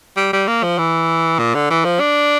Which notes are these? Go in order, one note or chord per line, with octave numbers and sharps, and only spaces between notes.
G3
G3
A#3
F3
E3
A#2
D3
E3
F3
D4